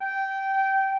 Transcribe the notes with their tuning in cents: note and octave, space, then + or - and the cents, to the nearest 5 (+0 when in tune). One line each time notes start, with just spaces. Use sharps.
G5 -15